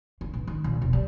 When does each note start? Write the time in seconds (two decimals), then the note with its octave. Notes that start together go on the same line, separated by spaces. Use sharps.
0.21 A#3
0.33 A1
0.47 D#3
0.64 A#1
0.82 E1
0.93 G3